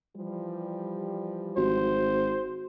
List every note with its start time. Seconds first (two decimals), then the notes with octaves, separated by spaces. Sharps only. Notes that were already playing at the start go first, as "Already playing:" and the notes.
0.17 E3 F3 G3
1.57 G#1 F#4 C5